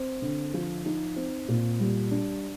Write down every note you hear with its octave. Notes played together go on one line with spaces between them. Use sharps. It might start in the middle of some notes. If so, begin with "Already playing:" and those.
Already playing: C4
D3
F3
D#4
C4
A#2
G3
D4